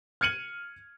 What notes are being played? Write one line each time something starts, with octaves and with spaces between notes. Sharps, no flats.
F6 G#6 C#7 D#7 F#7